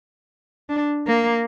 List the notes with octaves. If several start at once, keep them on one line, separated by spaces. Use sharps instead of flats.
D4
A#3